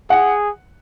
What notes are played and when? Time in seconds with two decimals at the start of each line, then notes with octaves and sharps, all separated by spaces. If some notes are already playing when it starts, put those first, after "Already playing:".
0.10 G#4 F#5